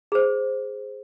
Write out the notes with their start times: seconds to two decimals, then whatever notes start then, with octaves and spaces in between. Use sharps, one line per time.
0.12 G#4 C5